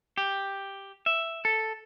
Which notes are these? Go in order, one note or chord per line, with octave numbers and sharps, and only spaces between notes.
G4
E5
A4